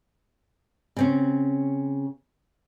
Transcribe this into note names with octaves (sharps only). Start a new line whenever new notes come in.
C#3 C4 C#4